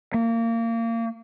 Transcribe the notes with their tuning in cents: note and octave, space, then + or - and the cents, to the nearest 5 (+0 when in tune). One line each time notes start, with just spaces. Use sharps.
A#3 -25